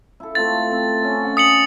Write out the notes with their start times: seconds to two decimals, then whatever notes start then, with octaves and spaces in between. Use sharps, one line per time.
0.20 E4 A4
0.35 A3 C4 F4 A6
0.71 C4
1.02 C#4 A4 E5
1.24 F#5 G#5
1.37 D#6 C#7 F#7